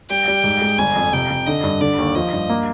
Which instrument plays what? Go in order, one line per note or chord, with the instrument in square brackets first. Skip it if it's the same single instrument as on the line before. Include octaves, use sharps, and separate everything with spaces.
[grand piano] G3 [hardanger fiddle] G5
[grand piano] G3
G#2
G#3
[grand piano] G1 [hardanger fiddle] G#5
[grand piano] F2
[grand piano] C3 [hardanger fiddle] G5
[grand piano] C3
[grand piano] D3 [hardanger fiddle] D#5
[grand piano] G2
[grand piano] D3 [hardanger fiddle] D5
[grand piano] D#2
[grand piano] F3 [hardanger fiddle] D#5
[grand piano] G2
A#3